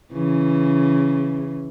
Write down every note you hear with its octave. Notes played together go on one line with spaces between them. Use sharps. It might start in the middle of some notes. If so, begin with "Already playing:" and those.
C#3 E3